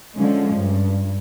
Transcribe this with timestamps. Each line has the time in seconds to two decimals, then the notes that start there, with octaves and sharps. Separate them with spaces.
0.14 D3 F3 G#3 C#4
0.55 G2